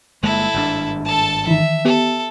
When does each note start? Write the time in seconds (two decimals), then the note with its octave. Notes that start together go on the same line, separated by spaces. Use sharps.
0.23 G1 G#3 A#3 E4 A4
0.54 G#1 G2 D4
1.05 A4 A5
1.47 D#3 E3 E5
1.85 B3 G4 A4